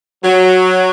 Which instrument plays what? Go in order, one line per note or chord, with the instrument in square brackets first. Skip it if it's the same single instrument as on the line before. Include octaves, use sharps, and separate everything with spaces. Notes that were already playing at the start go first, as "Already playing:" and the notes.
[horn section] F#3